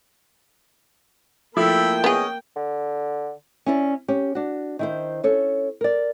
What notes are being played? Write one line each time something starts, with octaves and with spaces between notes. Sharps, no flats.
F3 A3 A#3 E4 A4 G5 B5
B3 C#4 G#4 D#5
D3
C#4 E4 D5
C#4 G4
D4 F#4
D#3 E4 C5
C#4 A4 C#5
A#4 D5